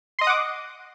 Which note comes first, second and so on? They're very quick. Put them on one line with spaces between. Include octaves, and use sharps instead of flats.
C6 D#5 D#6 F#5 D6